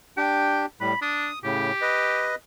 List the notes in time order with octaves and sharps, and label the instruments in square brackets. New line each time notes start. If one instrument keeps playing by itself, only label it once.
[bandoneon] D4 G4 [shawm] G5
[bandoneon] A2 G3 [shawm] B5
[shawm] D4 [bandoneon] D#6
[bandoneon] A2 C#3 [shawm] G4
[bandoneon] B4 D#5